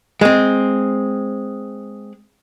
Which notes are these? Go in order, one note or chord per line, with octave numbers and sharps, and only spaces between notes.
G#3 C4